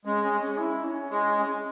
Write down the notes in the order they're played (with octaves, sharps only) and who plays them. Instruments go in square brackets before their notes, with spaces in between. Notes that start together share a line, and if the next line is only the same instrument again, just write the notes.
[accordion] G#3 [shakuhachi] C#4
[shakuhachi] C#4
C#4
E4
C#4
[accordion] G#3